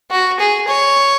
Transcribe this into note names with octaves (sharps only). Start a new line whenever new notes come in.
F#4
G#4
C#5